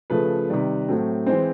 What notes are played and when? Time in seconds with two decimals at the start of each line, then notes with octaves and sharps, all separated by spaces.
0.10 C#3 F3 A3 B4
0.50 C3 D#3 G3
0.88 A2 F#3 A3 C4
1.26 E3 G#3 C4 C5